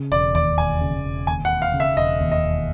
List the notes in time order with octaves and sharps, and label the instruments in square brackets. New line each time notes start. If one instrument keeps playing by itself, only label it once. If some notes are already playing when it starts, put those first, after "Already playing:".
Already playing: [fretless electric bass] C#3
[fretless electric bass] E1 [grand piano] D5
[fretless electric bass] D#2 [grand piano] D5
[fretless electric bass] E1 [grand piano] G#5
[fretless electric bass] C#3
E1
[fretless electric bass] D#2 [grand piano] G#5
[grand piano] F#5
[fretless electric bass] E1
[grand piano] F5
[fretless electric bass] C#3
[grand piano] E5
[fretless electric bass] E1 [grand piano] D#5
[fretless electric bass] D#2
[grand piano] D#5
[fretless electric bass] E1